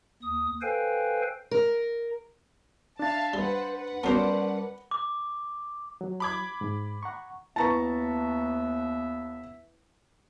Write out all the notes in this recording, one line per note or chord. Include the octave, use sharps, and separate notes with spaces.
D#2 D#6
A4 B4 C5 F5 G5 G#5
A#4
D4 E5 F5 A5 A6
G3 B4 C5 F#5
B4 F#5
F#3 G3 B3 C#4 A#4 C5 D5 A5
D6
F#3
B5 D6 G#6
G#2
F#5 A#5 C#6
D#2 B3 E4 B4 E5 A5 A#5 C#6